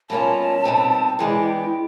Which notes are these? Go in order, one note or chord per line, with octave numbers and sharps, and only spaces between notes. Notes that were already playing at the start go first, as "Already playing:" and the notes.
B2 G3 A#3 C#4 F4 A5
B2 G3 C4 D#4
E3 G#3 B3 D4 G5